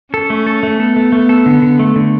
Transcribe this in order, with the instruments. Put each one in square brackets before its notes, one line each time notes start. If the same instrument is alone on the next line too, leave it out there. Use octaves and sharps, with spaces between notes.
[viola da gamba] C#4 [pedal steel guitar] A4
[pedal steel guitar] A3
A4
A3
[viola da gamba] B3 [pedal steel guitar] A4
[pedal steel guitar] A3
A3
A4
D3
D3
A3
D3